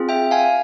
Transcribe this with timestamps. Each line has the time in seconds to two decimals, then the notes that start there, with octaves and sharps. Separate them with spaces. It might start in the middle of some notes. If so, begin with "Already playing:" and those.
Already playing: C4 F4 G#4
0.09 E5 G5
0.31 F5 G#5